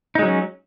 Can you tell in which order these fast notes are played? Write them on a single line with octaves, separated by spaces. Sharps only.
D#4 G#3 F#3 C#4